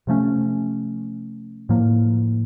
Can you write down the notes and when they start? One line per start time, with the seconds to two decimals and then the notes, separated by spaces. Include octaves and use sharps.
0.07 C3 F3 A3 C#4
1.69 A2 F3 A#3